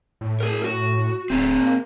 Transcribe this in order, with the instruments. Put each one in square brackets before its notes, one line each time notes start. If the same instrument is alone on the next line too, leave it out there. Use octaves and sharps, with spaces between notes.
[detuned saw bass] A2
[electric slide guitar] G#4 A#4
F#4
[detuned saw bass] D1 [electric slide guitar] C4 G#4
[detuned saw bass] A#3